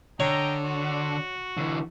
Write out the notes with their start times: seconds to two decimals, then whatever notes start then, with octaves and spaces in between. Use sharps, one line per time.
0.20 D3 C#5 D#5 G5 A#5
0.64 F#4
1.57 D3 E3